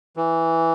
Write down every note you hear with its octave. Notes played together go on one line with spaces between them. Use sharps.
E3